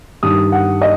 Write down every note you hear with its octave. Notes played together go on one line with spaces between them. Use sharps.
G2 D#3 D#6
F#5
D#5